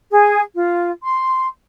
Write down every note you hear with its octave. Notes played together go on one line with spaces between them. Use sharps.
G#4
F4
C6